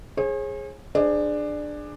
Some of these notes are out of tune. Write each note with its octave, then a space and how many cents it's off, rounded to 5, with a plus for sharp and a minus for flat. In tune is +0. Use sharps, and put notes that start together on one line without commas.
G#4 +0 C#5 -45
D4 +15 G#4 +0 C5 -15